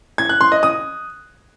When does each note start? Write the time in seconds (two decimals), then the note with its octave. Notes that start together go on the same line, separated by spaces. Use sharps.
0.18 G#6
0.29 F#6
0.41 C6
0.52 D#5
0.63 D#6